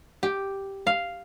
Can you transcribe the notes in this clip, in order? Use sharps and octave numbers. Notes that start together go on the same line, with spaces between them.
G4
F5